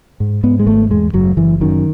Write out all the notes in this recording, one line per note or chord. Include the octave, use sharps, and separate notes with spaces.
G#2
G#2 B3
G#3
G#1 A3
E2 G#3
F#1 F#3
F#1 E3
F#2 D#3